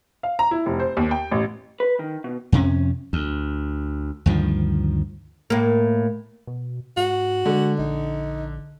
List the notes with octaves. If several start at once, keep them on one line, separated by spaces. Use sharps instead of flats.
F5
A#5
E4
F1
C5
D#2
G5
A1
B4
D#3
B2
F2 C3 C#4
D2
D2 G2 D#3 F3
A2 A#3
B2
G#2 F#4
D3 G#3
A#1 D#4